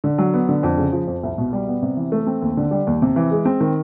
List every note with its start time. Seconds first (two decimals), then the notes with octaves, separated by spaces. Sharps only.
0.04 D3
0.18 F#3
0.34 B3
0.49 D3
0.63 F2
0.77 C#3
0.92 F3
1.07 F2
1.23 C2
1.38 B2
1.53 G3
1.68 B3
1.82 C3
1.97 E3
2.12 A3
2.27 C4
2.42 D#2
2.57 D3
2.71 G3
2.87 D#2
3.02 C3
3.16 E3
3.31 G#3
3.45 C4
3.60 D#3